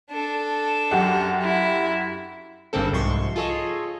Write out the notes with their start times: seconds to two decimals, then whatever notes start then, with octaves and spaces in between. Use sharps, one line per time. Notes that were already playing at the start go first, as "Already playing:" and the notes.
0.10 D4 A4
0.91 F#2 G4 F#5
1.41 E4
2.73 G1 G2 C#3 A#3 C4 A4
2.92 C2 G#2 F3 C6 C#6
3.36 F4 G#4 A4 C#5 D#5